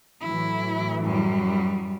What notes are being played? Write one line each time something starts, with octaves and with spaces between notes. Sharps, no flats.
A2 E3 F#3 E4
F#2 G3